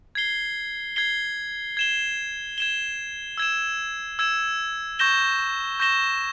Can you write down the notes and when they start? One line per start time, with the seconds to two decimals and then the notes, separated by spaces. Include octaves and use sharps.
0.15 G#6 C7 G7
0.96 G#6 C7 G7
1.77 G#6 E7 G7
2.58 G#6 E7 G7
3.38 E6 G#6 E7
4.19 E6 G#6 E7
4.99 C#6 G6 A#6 E7 G7
5.80 C#6 G6 A#6 E7 G7